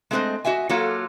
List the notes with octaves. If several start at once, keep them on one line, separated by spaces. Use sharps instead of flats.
G#3 A3 C4 A4 C5 D#5
F#4 D#5 E5 G#5
F#3 A#3 F4 F#4 A4